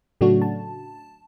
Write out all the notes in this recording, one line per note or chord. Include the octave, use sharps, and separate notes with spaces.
A2 C#3 F#3 A3 D4 F#4
A5